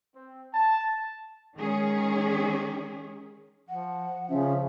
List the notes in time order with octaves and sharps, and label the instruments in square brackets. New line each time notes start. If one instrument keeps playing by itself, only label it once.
[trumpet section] C4
A5
[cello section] D#3 G#3 C#4 G#4
[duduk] F3 [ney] F#5
[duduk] C#3 [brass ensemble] F3 [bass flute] C#4 [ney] E5